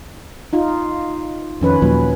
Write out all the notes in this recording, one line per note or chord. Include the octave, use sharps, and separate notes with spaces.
D#4 F4
F2 D#3 C#4 B4
D#2 A#2 F3 F#3